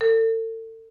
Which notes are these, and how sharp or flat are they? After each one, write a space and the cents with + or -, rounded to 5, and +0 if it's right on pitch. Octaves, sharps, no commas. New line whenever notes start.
A4 +35